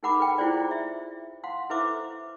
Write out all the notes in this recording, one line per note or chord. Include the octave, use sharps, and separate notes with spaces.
D#4 G#4 A#4 F#5 B5 D6
A4 B4 G5
E4 F4 G#4 C5 D5
E5
F5 F#5 C6
E4 A4 B4 C5 E5 D6